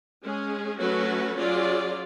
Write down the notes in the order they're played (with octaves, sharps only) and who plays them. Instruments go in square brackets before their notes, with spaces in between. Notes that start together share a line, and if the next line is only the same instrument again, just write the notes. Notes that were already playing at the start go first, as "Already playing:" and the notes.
[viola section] G#3 C#4 G#4
F#3 A3 C#4 F#4 B4
F#3 C#4 F4 G#4 D5